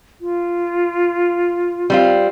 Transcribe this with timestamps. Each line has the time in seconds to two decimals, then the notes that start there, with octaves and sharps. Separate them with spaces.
0.21 F4
1.90 G3 C4 F4